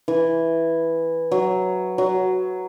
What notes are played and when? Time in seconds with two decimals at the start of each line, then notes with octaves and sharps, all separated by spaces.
0.08 E3
1.31 F#3
1.98 F#3